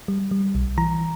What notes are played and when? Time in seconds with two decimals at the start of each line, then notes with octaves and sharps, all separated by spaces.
0.08 G3
0.31 G3
0.55 B1
0.78 E3 A#5